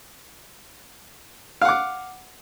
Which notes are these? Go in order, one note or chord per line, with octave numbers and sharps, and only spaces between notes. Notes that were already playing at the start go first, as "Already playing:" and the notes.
F5 F#5 D6